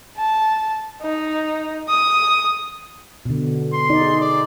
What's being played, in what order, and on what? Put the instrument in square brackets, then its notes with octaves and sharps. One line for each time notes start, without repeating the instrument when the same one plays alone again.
[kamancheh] A5
D#4
D#6
[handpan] B2 D3
[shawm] C6
[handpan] D#4 D5
G#4
[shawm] D5